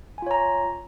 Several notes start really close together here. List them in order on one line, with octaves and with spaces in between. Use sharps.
G#5 F4 C#5 A#5